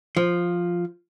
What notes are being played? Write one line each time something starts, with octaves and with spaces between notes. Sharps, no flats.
F3